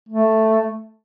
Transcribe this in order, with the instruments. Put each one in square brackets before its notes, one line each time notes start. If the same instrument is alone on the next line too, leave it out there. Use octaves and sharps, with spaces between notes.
[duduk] A3